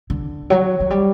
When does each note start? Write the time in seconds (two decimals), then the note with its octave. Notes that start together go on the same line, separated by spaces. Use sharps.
0.10 D3
0.50 F#3
0.80 F#3
0.90 G3